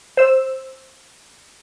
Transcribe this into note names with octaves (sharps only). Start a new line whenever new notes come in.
C5 E6